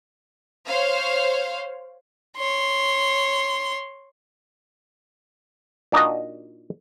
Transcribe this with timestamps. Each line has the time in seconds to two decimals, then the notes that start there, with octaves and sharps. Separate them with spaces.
0.67 C5 C#5 F5
2.37 C#5 C6
5.92 A#2 D4 D#4 F#4 D#5